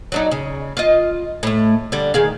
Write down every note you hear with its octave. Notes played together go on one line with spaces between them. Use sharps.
F#3 D4 D#4
C#3
F4 D#5
A2 A3
D3 G3
D#3 G#4 F5